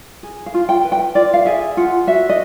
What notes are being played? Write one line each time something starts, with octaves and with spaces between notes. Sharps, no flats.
G#4
F5
F4
G5
B4
G5
F4 D5
F5
G#4 E5
F4 F#5
F#4 E5
D#5